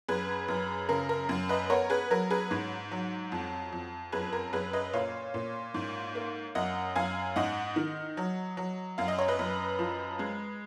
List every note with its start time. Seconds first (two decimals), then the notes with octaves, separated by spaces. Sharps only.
0.08 F#2 G#4 B4
0.48 F#2
0.89 C#3 A#4
1.09 A#4
1.29 F#2
1.49 B4 D#5
1.70 B3 A#4 C#5
1.90 G#4 B4
2.11 F#3 A#4
2.30 G#4 B4
2.51 G#2
2.91 F#3
3.32 F2
3.72 F2
4.12 F#2 G#4 B4
4.33 A#4
4.53 F#2 G#4 B4
4.73 B4 D#5
4.93 A#2 C#5 F5
5.34 A#2
5.74 G#2
6.15 A#3
6.55 F#2 D#5 F#5
6.96 F#2 F5 G#5
7.36 G#2 D#5 F#5
7.76 D#3
8.17 F#3
8.57 F#3
8.98 F#2 F5
9.08 D#5
9.18 C#5
9.28 B4 D#5
9.39 F#2
9.79 F3
10.19 G#3